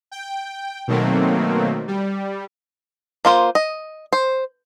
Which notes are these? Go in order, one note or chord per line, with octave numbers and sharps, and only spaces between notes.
G5
B2 D#3 F#3 A3 A#3 C4
G3
A#3 F4 C5
D#5
C5